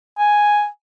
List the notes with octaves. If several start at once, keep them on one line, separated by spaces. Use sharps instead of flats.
G#5